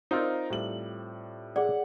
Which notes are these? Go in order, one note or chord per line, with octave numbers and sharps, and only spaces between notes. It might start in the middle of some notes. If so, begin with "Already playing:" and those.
C4 D#4 F4 A#4 C5 D5
A2 G3 F#7
G#4 D5 F#5